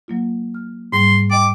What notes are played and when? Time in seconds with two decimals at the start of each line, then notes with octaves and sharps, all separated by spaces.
0.08 F#3 A#3 F4
0.54 F6
0.93 G#2 G3 C6
1.31 D#5 G5 D6